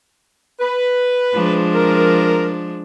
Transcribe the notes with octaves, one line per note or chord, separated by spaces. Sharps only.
B4
F3 G#3 D4
A#4